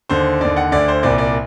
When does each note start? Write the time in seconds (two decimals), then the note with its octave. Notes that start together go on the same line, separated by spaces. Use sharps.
0.09 D#2 D3 C5
0.41 D#2 D3 D5
0.56 F#5
0.71 D2 D3 D5
0.88 C5
1.03 C2 A#2 D5
1.18 D5